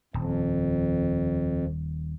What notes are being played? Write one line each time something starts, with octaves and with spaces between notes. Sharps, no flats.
D#1 F2